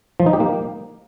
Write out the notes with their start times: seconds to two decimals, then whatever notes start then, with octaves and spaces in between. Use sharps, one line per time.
0.20 F3
0.26 D#4
0.33 G4
0.40 A#3